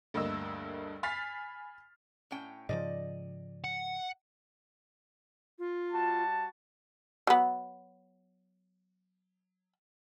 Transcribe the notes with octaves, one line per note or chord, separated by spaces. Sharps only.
D2 G2 A#3 D#5 E6
G#5 B5 F6 A6 B6 C7
A2 C#4 G5
G#2 C#3 F3 D5 D#5
F#5
F4
G3 F#4 A5
F#3 B3